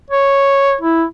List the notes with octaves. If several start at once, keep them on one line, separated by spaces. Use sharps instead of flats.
C#5
E4